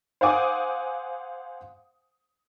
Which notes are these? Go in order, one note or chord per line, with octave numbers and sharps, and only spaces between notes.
C5 F5 F#5 G#5 D6 D#6